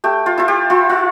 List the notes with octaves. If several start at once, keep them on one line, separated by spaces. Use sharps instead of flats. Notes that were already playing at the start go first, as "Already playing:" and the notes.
A3 G4
F4
E4 F4
G4
E4 F4
F4